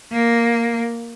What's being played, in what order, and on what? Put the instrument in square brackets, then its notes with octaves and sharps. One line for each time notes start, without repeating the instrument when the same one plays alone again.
[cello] A#3